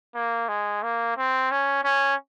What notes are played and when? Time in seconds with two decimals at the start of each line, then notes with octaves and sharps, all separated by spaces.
0.15 A#3
0.48 G#3
0.83 A#3
1.17 C4
1.51 C#4
1.84 C#4